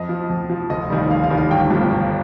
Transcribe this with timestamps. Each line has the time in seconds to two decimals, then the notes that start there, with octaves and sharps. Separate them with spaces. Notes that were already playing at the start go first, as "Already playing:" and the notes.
Already playing: F2 D#5
0.09 F3
0.30 F2
0.50 F3
0.70 F1 D#5
0.90 D#2 D#3 G3
1.11 F1 F5
1.24 F5
1.30 D#2 D#3 G3
1.37 F5
1.51 G1 G5
1.70 G2 F3
1.91 G1